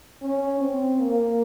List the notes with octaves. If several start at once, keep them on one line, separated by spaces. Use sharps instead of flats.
C#4
C4
A#3